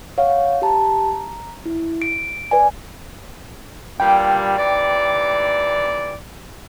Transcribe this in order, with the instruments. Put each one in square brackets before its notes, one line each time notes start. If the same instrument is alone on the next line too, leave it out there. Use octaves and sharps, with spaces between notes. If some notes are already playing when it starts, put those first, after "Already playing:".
[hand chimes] C#5 F5 F#5
G4 A5 A#5
A#5
E4
D7
B4 D5 G#5
[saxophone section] G2 A#2 G3 [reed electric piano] G5
[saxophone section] D#2 E3 D5